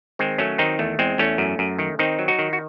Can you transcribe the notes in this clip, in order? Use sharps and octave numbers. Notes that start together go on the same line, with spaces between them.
D#3 G#3 C4
F#3 A3 C#4
D#3 C4 D#4
E2 A3
E2 G#3 C4
E2 A3 C#4
F#2
F#2
D#3
D#3 C4 D#4
F#3
D#4 F#4
D#3
F#4